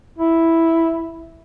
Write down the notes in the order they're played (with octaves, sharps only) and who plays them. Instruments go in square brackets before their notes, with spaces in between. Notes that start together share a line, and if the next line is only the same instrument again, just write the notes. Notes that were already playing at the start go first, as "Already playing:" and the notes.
[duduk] E4